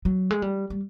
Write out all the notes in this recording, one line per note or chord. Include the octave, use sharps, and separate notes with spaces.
F#3
G#3
G3
G3